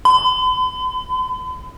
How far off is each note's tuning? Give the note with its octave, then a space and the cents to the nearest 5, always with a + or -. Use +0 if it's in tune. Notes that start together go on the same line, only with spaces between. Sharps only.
B5 +45